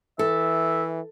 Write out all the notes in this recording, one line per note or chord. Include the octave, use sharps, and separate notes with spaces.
E3 A4 E5